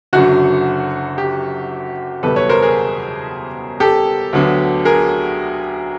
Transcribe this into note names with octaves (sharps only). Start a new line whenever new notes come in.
F#1 F#2 D3 F#3 F#4
G4
F#1 E2 B2 G3 A4 B4
B4 C#5
A#4 C5
G#4 A#4
G4 A4
D2 D3 F#3 B3
G#4 A#4